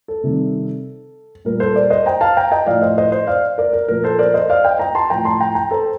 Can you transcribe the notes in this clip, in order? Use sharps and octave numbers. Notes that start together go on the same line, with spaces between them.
A4
C3 D#3 G3
A#2 G3 A#4
A4 C5
A#4 D5
C5 D#5
G5 A#5
F5 A5
G5 A#5
D#5 G5
A2 F3 D5 F5
C5 D#5
C5 D#5
C5 D#5
D5 F5
A#4 D5
A#4
A#2 F3 A#4
A4 C5
A#4 D5
C5 D#5
D5 F5
D#5 G5
G5 A#5
A5 C6
A2 F3 G5 A#5
A5 C6
G5 A#5
G5 A#5
A4 C5